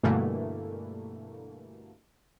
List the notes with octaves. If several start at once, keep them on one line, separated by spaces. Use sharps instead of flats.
G2 B2 D3 E3 A3 A#3